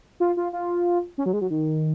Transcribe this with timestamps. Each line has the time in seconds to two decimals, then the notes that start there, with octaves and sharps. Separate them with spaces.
0.20 F4
0.37 F4
0.53 F4
1.18 C#4
1.26 F#3
1.33 G#3
1.41 F#3
1.50 D#3